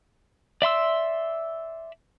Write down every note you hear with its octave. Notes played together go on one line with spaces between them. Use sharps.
D5 E5 C6 E6